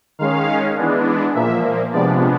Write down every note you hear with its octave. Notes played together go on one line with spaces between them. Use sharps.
D#3 G#3 C#4 F5
E3 G#3 B3 D4
A#2 F3 A#3 E5
C3 F3 G#3 B3 D4 D5